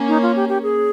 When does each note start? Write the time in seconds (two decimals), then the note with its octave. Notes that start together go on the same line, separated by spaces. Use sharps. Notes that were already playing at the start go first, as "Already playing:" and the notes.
Already playing: A#3 C#4
0.08 D#4
0.22 F4
0.36 G4
0.49 G4
0.63 G#4